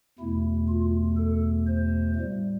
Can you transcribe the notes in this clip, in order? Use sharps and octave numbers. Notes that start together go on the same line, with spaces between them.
E2 B2 A3 E4
F4
A4
C5
A2 G3